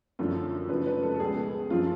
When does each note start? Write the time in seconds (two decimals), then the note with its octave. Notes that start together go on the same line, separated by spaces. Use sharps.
0.19 F#2 D3 F3
0.69 F#2 C#3 F3 B4
0.86 B4
1.03 A4
1.15 A4
1.20 C#2 B2 G#4
1.70 F#2 F3 F4